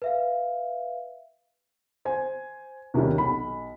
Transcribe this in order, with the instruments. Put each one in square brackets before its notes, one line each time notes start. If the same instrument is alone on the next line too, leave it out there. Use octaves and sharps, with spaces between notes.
[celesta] B4 E5 F5
[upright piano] C5 G#5
D#2 C3 D#3 G3 C#4
B1 B5